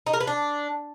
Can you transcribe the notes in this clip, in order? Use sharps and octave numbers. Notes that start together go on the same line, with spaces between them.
D#4
A#4
B4
D4